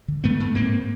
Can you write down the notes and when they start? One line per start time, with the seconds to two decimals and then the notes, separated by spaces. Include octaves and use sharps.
0.08 D3
0.24 G#2 A3 B3
0.40 G#2
0.55 G#2 A#3 C4